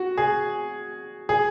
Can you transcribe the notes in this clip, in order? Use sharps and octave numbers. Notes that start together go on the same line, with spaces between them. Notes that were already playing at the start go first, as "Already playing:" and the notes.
Already playing: F#4
G#4
G#4